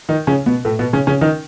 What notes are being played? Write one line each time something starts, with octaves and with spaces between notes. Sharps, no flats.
D#3 D#4
C#3 C#4
B2 B3
A2 A3
B2 B3
C#3 C#4
C#3 C#4
D#3 D#4